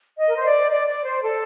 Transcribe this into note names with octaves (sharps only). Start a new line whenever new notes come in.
D#5
A#4
C5
D5
D5
D5
C5
A4